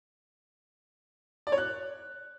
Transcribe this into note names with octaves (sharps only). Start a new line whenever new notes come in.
D5
C#5
F#6